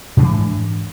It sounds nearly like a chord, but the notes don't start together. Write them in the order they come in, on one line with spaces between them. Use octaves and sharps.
G#2 D4 E3